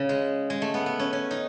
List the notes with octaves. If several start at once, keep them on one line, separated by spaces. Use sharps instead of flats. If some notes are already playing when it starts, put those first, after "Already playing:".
Already playing: C#3
G#3
G#3
A3
B3
B3
C#4
C#4
D#4